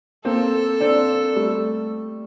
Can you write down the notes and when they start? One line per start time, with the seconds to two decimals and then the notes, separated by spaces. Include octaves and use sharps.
0.25 A#3 C4 A4
0.81 C4 D4
1.36 G3 A3